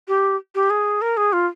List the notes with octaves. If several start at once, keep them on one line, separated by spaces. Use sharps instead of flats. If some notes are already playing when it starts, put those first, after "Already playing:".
G4
G4
G#4
A#4
G#4
F4